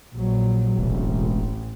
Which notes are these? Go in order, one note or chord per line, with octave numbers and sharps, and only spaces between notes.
A#1 F#3
E1 A1